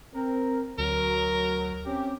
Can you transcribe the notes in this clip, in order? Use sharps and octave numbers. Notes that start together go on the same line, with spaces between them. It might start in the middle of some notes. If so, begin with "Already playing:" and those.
C4 A#4
D2 F#3 A#4
C4 C#4 G4